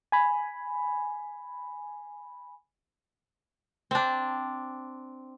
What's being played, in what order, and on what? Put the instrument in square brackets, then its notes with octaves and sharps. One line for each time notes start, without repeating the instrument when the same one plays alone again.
[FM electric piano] G#5 B5
[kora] C4 D4